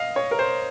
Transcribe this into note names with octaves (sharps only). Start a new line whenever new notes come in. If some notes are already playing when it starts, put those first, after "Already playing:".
Already playing: D#5 F5
C#5
A#4
C5